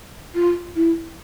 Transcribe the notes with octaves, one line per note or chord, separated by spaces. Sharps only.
F4
E4